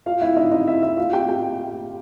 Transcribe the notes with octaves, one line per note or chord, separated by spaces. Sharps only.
F4 F5
E4 E5
D#4 D#5
D#4 D#5
E4 E5
E4 E5
F4 F5
G4 G5
G4 G5